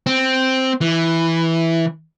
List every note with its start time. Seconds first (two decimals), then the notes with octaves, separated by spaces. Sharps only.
0.06 C4
0.81 E3